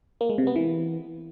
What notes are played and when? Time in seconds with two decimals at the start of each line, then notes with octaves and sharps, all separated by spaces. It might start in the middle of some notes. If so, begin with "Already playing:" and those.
0.21 A#3
0.29 G#3
0.38 C3
0.47 B3
0.56 E3